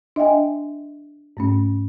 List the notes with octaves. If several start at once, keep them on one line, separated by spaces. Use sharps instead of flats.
D4 D#5 E5 G5 G#5
G#2 A3 C#4